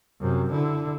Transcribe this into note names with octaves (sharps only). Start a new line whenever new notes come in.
F#2 C3
D3 E4